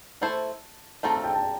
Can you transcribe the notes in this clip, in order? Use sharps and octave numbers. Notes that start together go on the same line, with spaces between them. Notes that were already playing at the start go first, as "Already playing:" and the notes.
A3 E4 A4 C5 A5
A3 C4 F4 A4 A#5
A5
G5
A5